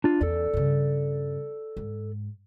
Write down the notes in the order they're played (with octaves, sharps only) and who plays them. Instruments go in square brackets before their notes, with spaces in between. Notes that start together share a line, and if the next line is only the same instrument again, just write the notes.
[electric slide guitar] D4 F4
[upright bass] E2 C#4 [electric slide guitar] A4 D5
[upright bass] G2 C#3
G#2